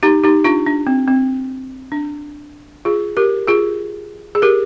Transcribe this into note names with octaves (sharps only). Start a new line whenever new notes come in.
D#4 G4
D#4 G4
D4 F4
D4
C4
C4
D4
F4 G#4
G4 A#4
F4 G#4
G#4
G4 A#4